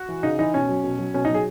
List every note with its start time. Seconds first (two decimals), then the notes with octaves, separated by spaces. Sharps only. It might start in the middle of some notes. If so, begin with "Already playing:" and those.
Already playing: F#4
0.09 E3
0.23 C#3 D#4
0.39 E3 D#4
0.53 B2 C#4
0.69 F#3
0.84 B2
0.99 F#3
1.14 B2 C#4
1.25 F#3 D#4
1.34 G#4